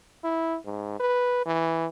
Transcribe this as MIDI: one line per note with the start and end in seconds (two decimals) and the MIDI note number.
0.24 0.58 64
0.66 0.98 44
1.00 1.42 71
1.46 1.86 52